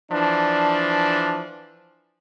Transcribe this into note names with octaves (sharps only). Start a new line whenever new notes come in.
E3 F3 D4